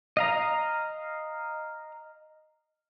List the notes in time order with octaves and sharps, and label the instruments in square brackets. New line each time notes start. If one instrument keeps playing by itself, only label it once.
[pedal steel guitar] D#5 F5 A#5